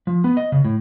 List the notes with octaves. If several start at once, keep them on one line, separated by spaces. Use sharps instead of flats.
F3
B3
D#5
C#3
A2